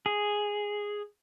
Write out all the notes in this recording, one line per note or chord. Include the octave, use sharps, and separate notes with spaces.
G#4